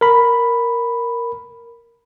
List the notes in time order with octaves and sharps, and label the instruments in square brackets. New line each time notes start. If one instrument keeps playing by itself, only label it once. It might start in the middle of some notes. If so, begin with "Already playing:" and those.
[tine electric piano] A#4 B5